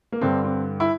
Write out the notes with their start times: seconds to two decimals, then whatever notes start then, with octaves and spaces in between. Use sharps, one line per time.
0.12 A#3
0.21 G2 D3 C4
0.44 C4
0.80 E4